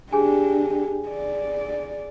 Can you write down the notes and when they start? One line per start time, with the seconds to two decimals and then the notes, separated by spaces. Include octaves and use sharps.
0.13 D4 G4 G#4 G#5
1.09 D5